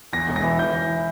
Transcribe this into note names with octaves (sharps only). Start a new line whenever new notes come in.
E2 A#6
E1
A#6
E3
E3 G6
E3